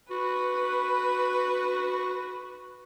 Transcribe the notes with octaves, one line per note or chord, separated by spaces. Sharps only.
F#4 B4